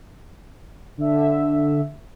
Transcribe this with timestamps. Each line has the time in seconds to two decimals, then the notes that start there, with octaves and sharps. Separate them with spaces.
0.98 D3 E5